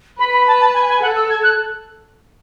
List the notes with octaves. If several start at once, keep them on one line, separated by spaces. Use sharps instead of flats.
B4 B5
B5
A5
A5
G#5
G#5
A4 F#5
E6
G#6
F#6